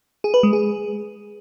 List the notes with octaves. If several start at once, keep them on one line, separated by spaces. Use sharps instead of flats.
G#4
B4
G#3
G#4